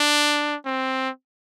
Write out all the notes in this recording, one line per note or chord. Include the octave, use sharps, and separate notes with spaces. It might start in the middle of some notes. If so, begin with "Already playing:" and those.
Already playing: D4
C4